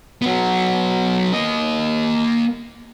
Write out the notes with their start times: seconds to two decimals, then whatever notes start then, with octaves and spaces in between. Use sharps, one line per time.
0.22 F#3 B3
1.33 A#3 D#5